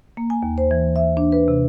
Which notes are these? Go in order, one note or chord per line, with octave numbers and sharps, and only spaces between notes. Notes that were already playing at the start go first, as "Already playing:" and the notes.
A#3
G#5
D#2
C5
E3
E5
D4
B4
C3